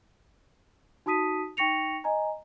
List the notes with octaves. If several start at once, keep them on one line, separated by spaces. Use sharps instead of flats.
D#4 F#4 A5 D#6 B6 D#7
D#4 G5 C#6 A#6 C#7 F7
D#5 G#5 A#5